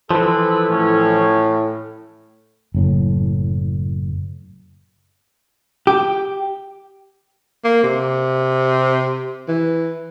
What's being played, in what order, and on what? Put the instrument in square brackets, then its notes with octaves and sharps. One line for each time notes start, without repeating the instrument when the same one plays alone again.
[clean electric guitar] E3 F3 [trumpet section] C4 E4 B4 [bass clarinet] A4
[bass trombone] A2 [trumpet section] C#4
[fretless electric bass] F#1 A2
[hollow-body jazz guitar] G4
[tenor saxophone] A#3
C3
E3